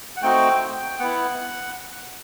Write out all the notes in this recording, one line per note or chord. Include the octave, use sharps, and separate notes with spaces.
F#5
A3 C4 D#4 F#4 G5
G5
B3 E4 F#5